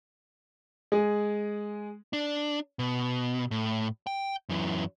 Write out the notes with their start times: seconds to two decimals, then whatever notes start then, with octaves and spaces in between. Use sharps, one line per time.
0.92 G#3 G#4
2.13 D4
2.79 B2
3.51 A2
4.07 G5
4.49 F#2 E3